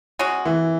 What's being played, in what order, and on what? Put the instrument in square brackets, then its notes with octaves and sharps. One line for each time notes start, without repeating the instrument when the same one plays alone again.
[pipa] G#3 C#4 F#4
[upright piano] E3